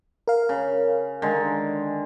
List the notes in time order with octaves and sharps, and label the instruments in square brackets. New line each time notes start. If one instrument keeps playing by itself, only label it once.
[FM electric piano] A#4 F5
[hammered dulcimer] C#3
D3 D#3 G#3